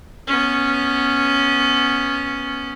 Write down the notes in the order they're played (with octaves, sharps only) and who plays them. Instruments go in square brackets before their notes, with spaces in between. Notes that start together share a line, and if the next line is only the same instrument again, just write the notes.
[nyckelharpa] B3 C#4